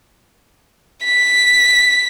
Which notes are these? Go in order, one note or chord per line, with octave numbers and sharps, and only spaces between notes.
B6